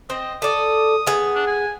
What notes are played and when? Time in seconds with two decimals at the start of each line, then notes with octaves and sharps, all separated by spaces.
0.10 C4 D#5
0.42 A4 D5 D#6
1.07 B3 G#4
1.35 D4
1.47 G#5